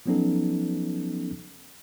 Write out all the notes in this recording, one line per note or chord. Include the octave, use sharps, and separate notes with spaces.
F3 F#3 B3 C#4 D#4 A4